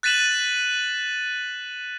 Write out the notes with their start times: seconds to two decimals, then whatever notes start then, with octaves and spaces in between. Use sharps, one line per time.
0.03 F#6 A6 B6 D#7 E7 F#7